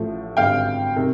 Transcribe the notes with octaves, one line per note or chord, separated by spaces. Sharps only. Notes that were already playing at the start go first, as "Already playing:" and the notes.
Already playing: A1 A2 F3 A3
G#1 G2 D3 F5 G5
C3 D#3